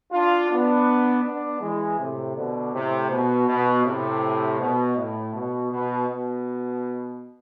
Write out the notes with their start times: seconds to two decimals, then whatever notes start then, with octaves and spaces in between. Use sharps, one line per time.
0.12 D4 F4
0.49 B3 D4
1.23 B3 D4
1.61 E3 G#3
1.98 A2 C3
2.35 B2 D3
2.73 A2 C3
3.09 B2
3.47 B2
3.84 A2 C3
4.59 B2
4.96 A2
5.33 B2
5.70 B2
6.08 B2